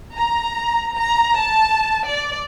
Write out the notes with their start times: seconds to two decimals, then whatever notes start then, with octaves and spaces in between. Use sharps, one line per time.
0.15 A#5
0.96 A#5
1.38 A5
2.07 D5